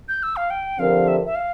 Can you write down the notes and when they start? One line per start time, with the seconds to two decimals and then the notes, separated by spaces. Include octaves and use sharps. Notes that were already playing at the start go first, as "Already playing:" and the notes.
0.08 G6
0.23 E6
0.36 F5
0.50 G5
0.79 D3 F3 C4 G4 A#4 F5
1.08 E5
1.26 E5
1.35 F5